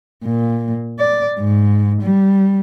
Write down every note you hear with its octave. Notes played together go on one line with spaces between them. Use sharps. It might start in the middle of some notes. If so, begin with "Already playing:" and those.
A#2
D5
G#2
G3